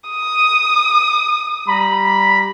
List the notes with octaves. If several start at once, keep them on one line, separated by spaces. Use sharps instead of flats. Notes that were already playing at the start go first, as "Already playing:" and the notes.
D#6
G3 A#5 B5